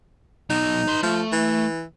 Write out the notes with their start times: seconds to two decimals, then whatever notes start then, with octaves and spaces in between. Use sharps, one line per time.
0.50 B2 F#3 D#4
0.88 B4 C6
1.03 F3 A3
1.32 E3